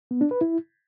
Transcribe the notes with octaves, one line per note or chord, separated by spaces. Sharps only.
B3
D4
B4
E4